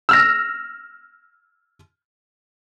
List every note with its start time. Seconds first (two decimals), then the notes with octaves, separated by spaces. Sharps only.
0.09 E6 F6 A#6